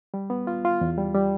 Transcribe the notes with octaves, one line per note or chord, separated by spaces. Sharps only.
G3
B3
F4
F4
E2
G3
G3